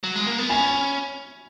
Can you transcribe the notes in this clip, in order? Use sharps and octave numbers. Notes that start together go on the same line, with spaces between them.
F#3
G#3
A#3
B3
C#4 G#5 B5